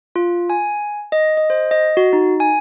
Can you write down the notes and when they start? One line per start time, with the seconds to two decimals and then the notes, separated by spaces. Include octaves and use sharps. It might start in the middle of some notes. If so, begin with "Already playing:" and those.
0.16 F4
0.50 G#5
1.12 D#5
1.37 D#5
1.50 C5
1.71 D#5
1.97 F#4
2.13 D#4
2.40 G#5